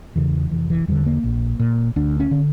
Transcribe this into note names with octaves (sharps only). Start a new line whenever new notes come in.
E2 C#3 E3
F1 E3
E3
E2 D3 G3
A#3
A#1
A#2
D2 D4
C#4
D3